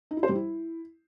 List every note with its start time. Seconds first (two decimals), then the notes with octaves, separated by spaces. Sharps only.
0.11 D#4
0.17 E4
0.23 C5
0.29 G3
0.35 E4